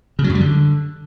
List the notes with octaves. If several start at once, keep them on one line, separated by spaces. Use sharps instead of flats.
C#3
F#3
F#2
G3
D3